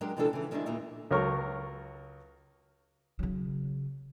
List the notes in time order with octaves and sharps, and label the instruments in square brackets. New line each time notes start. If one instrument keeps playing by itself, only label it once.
[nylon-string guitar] F#3 G#3 D4 G4 A#4
C3 E3 F3 G#3 D4 A4
C#3 E3
D#3 G3 G#3 C4 D4 E4
D#2 A#2 A#3 D#4 E4
[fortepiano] C#2 F#3 A4 A#4 C#5 C#6
[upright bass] C#3 F#3